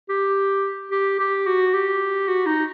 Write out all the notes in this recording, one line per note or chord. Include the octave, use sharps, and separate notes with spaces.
G4
G4
G4
F#4
G4
F#4
D#4